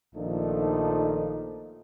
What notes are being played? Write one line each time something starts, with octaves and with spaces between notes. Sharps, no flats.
A#1 D#3 F3 A3 D4 D#4